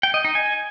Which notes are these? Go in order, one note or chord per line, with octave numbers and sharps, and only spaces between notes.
G5
D#5
D#4
G#5